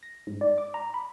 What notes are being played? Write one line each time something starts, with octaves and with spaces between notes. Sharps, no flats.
A#6
G#2
D5
D6
A#5
B5